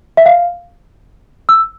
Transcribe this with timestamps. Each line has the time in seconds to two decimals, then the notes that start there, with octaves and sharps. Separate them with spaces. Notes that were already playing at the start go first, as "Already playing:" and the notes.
0.17 E5
0.26 F5
1.49 E6